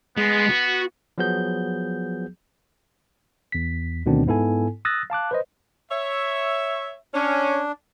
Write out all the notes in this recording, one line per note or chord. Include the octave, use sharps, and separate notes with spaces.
G#3 B3
F#4
F3 F#3 B3 G#4 G6
E2 B6
D2 B2 D#3 B3 C4 D4
G#2 B3 E4 A4 G#5
D#6 E6 F#6 A6 A#6
F5 A5 D6 F#6
B4 C5 D#5
C#5 E5
C#4 D4